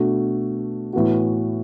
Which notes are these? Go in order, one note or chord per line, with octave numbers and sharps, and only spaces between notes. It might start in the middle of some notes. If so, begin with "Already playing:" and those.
Already playing: B2 A3 D4 F#4
A2 E3 B3 F#4